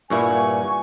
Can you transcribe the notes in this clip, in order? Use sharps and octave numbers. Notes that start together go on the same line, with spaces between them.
G2 A#2 E4 B4 F#5 G#5 C#6